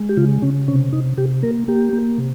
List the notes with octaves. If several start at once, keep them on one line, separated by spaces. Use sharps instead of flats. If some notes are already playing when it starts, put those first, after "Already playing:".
Already playing: G#3
G4
C#3 F4
C#3 C#4
C3 C#4
C3 D#4
C3 G4
A#3 A#4
A#3 G4
A#3
C3